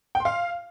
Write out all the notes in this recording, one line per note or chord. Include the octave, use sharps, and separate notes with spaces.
G5
C6
F5